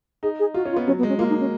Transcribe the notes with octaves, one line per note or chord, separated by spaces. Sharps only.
D#4 G#4
G#4
F4 F#4
C#4
F4
B3
F#3 C#4
B3
G#3
C#4
A#3 F4
D#4
C#4